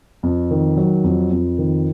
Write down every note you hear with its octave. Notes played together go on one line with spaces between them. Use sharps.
F2
D#3
F#3
F2
F2
D#3